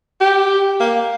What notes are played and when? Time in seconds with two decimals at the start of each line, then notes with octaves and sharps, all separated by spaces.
0.21 G4
0.80 A#3